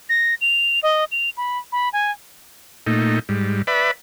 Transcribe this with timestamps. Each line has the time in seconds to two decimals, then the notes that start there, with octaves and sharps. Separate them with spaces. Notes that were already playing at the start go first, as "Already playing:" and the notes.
0.09 A#6
0.41 F7
0.83 D#5
1.12 F7
1.37 B5
1.72 B5
1.93 G#5
2.87 A#2 A3 D#4
3.29 G#2 G3
3.67 B4 D5 E5 B5